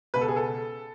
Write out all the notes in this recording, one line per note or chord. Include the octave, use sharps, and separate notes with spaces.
C#2 B2 B4
A4
G#4
A4